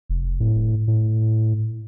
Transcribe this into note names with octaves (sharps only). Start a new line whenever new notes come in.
F1
A2
A2